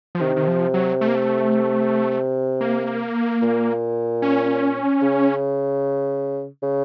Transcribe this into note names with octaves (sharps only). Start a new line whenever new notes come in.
F3
C3 D#3
D#3
F3
F#3
A3
A#3
A3
A#3
A#2
C#4
C#3
C#3